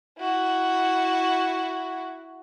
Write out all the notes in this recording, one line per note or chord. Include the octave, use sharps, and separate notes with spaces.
E4 F#4